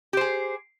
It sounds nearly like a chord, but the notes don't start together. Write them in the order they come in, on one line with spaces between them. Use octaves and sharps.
G4 C5 G#4